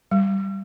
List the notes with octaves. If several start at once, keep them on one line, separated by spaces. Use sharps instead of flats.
G3